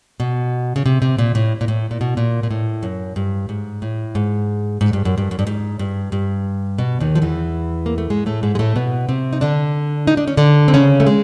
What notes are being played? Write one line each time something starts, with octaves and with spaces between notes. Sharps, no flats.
B2
C#3
C3
C3
A#2
A2
A#2
A2
A#2
B2
A#2
A#2
A2
F#2
G2
G#2
A2
G#2
G#2
G2
F#2
G2
F#2
G2
G#2
G2
G2
B2
D#2 D#3
F3
E2 E3
A#3
A3
G#2 G#3
A2 A3
G#2 G#3
G#3
A2 A3
B2 B3
C3 C4
D#4
D3 D4
D#4
D4
C#4
D3 D4
C4
C#3 C#4
A3
G#3